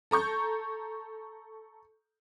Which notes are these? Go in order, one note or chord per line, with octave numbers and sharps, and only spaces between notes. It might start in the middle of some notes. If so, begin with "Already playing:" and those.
A4 A#5 C#6 G6